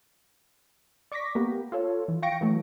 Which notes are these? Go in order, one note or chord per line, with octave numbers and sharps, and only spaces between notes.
D5 C#6 D6 A#6 B6
A#3 B3 G4
F4 A4 C#5
E3
F5 G5 C#6 A#6 C#7 D7
E3 F#3 A3